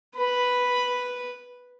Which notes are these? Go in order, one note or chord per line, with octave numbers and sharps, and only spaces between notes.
B4 B5